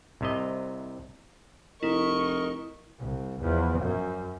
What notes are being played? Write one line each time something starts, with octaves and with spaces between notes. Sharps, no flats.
C2 C3 D#5
F1 E4 A#4 D#5 C#6
C2
E2 F3
F#2